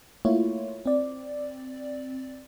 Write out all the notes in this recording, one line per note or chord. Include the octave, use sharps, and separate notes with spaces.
A3 A#3 E4 F4 C#5
C4 D5